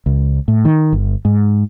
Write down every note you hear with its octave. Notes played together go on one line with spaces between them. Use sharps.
C#2
A2
D#3
G1
G#2